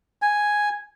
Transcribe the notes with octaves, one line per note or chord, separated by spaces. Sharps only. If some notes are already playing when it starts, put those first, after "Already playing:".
G#5